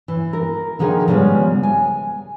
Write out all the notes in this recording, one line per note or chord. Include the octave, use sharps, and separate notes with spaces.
E3
A#4
D3 D#3 F3 G#4
C#3 F3 G3 G#3 B3
G#5